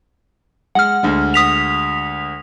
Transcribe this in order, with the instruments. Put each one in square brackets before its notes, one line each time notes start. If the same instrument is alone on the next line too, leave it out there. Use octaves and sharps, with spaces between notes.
[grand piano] G#3 [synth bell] F#5 F6
[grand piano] D2 D3 G#3
[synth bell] D#6 B6 F7